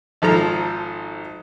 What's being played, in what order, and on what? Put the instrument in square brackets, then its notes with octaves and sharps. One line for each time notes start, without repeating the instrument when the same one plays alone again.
[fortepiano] G#1 F3 A4 A#5